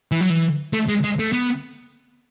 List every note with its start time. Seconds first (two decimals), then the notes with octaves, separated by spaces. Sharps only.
0.12 E3
0.21 F#3
0.30 E3
0.73 A3
0.88 G#3
1.04 G#3
1.19 A3
1.33 B3